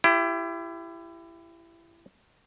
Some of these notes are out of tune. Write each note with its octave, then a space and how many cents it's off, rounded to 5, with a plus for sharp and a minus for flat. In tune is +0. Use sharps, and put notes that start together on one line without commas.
E4 +25 G4 +0